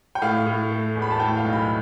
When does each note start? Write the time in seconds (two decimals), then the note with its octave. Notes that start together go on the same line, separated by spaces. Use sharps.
0.15 G5
0.22 A2 F5
0.46 A2
0.71 A3
0.95 E2
1.02 B5
1.11 A5
1.20 A2 G5
1.37 F5
1.44 B1
1.53 B5